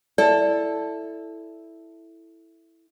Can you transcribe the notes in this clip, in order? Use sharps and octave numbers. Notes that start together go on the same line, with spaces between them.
E4 A4 D5